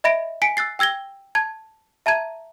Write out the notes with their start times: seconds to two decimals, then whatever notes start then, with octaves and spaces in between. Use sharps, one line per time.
0.04 D#5 E5 B5 A#6 D7
0.42 G#5 B6 C#7 D7
0.57 E6 F#6 A6 C7
0.79 G5 E6 G#6 A#6 G7
1.35 A5 G#6
2.06 E5 A5 A#5 G#6 D#7